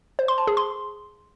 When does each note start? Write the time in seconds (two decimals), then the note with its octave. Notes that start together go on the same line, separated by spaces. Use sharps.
0.19 C5
0.28 C6
0.38 A5
0.47 G#4
0.57 C6